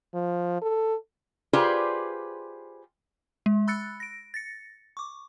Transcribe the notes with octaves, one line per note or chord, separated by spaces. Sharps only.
F3
A4
F4 G4 G#4 B4 C5 D5
G#3
B5 E6 F#6 A6 C#7
A#6 D7
A6 A#6 C#7
C#6 D6